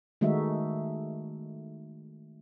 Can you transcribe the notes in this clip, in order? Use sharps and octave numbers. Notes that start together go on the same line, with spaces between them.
D#3 G#3 A3 D#4 F#4 E5